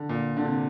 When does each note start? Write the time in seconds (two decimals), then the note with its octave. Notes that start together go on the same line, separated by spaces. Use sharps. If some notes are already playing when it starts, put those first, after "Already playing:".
Already playing: D3
0.09 A#2
0.37 D3
0.45 C3